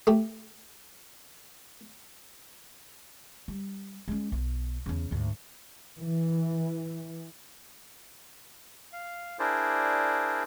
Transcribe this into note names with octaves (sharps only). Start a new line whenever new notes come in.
A3 G4
G3
G#3 C#4
B1
E2 C#3
D2 G#2
E3
F5
D4 E4 G#4 A#4 C5 D5